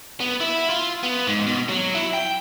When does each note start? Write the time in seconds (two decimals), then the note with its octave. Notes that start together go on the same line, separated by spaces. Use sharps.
0.20 B3
0.40 E4
0.69 F4
1.03 B3
1.27 G#2
1.47 B2
1.69 F#3
1.95 E4
2.13 G5